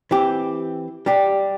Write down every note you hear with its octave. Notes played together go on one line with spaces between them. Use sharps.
E3 C4 G4
G3 D4 G4